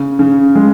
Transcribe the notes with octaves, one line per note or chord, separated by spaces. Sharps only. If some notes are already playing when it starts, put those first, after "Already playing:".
Already playing: C#3
C#3
G#3